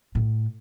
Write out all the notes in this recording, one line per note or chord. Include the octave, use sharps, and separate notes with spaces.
A2